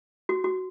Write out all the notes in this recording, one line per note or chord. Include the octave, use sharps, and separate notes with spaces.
F#4
F#4